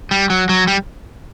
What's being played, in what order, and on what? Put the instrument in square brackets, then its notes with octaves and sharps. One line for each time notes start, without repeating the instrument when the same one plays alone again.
[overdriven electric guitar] G3
F#3
F#3
G3